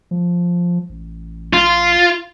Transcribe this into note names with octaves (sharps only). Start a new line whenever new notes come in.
F3
A1
F4